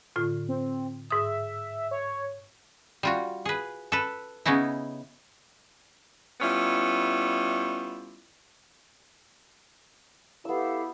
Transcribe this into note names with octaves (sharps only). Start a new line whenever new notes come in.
A2 D3 F4
C4
G#2 E5 D#6
C#5
G3 F4 F#4
G#4 B4
A4 B4
C#3 B3 C#4 D#4 E4
G3 B3 C#4 E4 F4
B3 E4 G4 A4 F5 E6